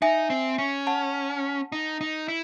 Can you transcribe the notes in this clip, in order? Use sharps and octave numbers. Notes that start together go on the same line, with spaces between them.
D#4 E5 G#5
C4
C#4
F#5 A5
D#4
D#4
E4